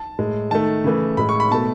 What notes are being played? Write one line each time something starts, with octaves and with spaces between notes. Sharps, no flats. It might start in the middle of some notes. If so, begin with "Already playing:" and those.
Already playing: A5
A2 G#3
D#3 A3 A5
C#3 E3 A3
A2 G#3 B5
C#6
B5
B2 A3 A5